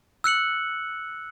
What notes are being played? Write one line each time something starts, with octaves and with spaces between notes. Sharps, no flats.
E6 F#6 C#7 F#7